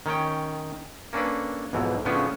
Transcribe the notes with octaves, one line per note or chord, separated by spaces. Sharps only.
D#3 C#4 C#5 G5
A#3 C#4 D4 A4 B4
B1 F2 G#2 B2 E3
A2 C#3 F3 B3 C#4 D4